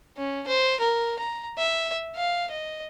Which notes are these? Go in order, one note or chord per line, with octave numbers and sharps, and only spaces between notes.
C#4
C5
A#4
A#5
E5
F5
D#5